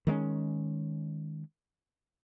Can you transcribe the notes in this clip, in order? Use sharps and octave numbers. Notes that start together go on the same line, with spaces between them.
D#3 G#3 A#3 C#4